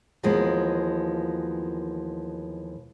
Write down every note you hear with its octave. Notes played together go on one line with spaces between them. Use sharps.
D#2 B2 E3 F3 G#3 A#3